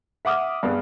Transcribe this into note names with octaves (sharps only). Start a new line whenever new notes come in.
E5 F#5 D6 D#6 F6
G2 B3 G#4